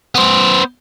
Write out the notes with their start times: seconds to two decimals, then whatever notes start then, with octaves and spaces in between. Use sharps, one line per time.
0.15 B3 C5